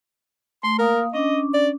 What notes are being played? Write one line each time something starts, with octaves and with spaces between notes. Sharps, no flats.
A3 C6
A#3 A#4 F5 D#6
C#4 D4 D#5 D6
D5